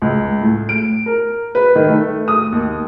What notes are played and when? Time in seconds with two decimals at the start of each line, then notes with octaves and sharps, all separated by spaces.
0.02 C#2
0.41 A2
0.69 D7
1.06 A#4
1.55 B4
1.75 D#3
1.88 A3
2.28 D#6
2.52 D#2